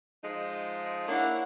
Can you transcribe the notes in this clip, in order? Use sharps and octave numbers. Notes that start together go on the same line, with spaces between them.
F3 G#3 D#4
A#3 D4 E4 C#5 F#5